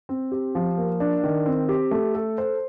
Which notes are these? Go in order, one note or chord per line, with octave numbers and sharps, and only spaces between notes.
C4
G4
F3
A#3
D4
D#3
C4
G4
A3
A4
C5